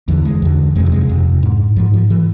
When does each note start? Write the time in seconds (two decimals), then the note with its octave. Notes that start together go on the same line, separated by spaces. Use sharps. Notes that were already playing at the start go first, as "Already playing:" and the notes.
0.08 E2 D3 E3
0.25 G#3
0.42 E2 D3
0.75 F2 G#3
0.80 C3
0.86 F3
0.92 G#3
1.09 F2 C3
1.43 G#2
1.76 G#2 F3
1.94 F3
2.10 E3